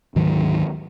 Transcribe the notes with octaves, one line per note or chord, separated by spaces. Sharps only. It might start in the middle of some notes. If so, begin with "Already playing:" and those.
D2 G#2 D#3 F#3